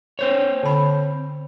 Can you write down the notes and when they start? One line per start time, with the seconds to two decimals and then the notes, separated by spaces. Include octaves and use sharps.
0.19 C4 C5 C#5
0.63 D3 B5